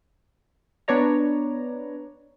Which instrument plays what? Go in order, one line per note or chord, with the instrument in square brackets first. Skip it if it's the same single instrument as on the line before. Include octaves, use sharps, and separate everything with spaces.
[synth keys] B3 D4 B4 C#5 D5 A#5